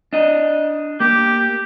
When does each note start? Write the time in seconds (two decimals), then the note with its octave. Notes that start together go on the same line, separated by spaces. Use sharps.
0.13 D4 D#5
1.00 A#3 G4